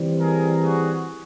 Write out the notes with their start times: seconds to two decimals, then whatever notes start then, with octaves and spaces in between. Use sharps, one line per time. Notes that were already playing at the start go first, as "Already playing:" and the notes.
Already playing: E3 G3 C4
0.20 G#4 A#4
0.61 F#4 G#4